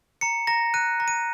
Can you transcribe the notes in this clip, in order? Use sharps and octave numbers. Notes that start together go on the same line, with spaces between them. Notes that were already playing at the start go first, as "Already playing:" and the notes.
A#5 C#7
A#5 A#6
F#6 D#7
A#5
D#7